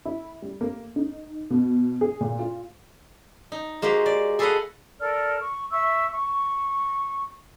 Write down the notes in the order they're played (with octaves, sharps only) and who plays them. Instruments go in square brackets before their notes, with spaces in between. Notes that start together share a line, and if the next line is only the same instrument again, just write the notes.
[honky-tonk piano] E4
G3
A#3
D#4
B2
G#4
A#2
F4
[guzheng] D#4
G#3 A#3 F#4 G4 C5
D5
G#4 A4 B4 D#5 F5 F#5
[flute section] A4 A#4 D5 F6
C#6
E5 C#6 E6
C#6